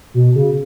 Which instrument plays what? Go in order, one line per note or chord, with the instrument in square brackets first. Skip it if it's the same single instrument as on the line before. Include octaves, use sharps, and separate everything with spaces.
[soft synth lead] B2
C#3